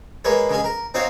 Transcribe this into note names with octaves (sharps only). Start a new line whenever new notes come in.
G#3 A#3 B4 C#5
C#3 G#3 G#4
A#4
C4 D#4 F#4 C#5 F5